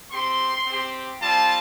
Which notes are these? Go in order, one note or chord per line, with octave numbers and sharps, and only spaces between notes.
C4 G4 C6
C4
G4
G3 C4 F4 A5